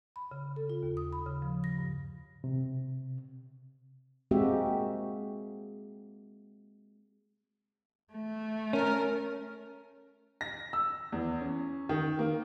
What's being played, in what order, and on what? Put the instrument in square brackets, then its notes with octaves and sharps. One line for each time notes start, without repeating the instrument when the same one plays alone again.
[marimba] B5
C#3
A4
F4
D#2
D#6
B5
C#3
F3
A#6
G2
[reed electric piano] C3
[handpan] G#3 A#3 C4 F#4 G4 E5
[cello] A3
[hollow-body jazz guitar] C#4 [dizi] A#4
[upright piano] A#6
E6
E2
C#4
D#3
A#3